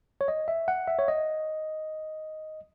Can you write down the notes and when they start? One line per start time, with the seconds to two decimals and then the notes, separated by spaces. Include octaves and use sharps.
0.21 C#5
0.28 D#5
0.48 E5
0.68 F#5
0.88 E5
0.99 C#5
1.08 D#5